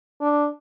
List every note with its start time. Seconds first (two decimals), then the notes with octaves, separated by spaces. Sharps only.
0.21 D4